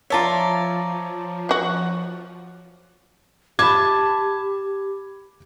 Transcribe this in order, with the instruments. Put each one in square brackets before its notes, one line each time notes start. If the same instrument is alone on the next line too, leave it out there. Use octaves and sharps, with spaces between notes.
[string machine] F3 [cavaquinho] F4 D5 E5 [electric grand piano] C#5 A5 A#5
[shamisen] F#3 F#4
[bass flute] G4 [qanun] A5 [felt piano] B5 G#6 [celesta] D6